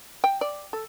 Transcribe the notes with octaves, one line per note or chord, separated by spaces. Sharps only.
G5
D5
A4